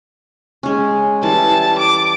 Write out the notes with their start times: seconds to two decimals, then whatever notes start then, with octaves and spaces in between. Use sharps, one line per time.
0.63 G#3 C#4
1.23 E3 G3 A4 A5
1.78 D6